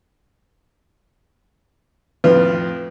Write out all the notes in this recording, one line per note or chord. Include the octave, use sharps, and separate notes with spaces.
F2 A2 F4 B4